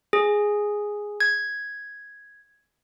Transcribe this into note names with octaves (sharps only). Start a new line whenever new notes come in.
G#4
G#6